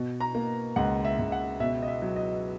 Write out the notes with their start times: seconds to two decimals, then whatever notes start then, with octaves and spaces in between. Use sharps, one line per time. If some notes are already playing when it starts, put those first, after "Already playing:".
Already playing: B2
0.20 A#5
0.35 A#3
0.76 C#2 F#5
1.05 E5
1.19 C#2
1.32 F#5
1.60 B2 E5
1.83 D#5
1.88 E5
2.02 F#3
2.16 D#5